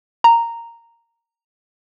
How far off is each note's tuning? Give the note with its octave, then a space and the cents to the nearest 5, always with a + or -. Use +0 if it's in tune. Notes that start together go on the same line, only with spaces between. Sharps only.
A#5 -10